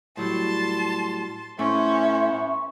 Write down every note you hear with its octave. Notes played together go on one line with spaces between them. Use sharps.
A2 F#3 G3 A5 C6
A2 A3 B3 C#4 C5 E5 C#6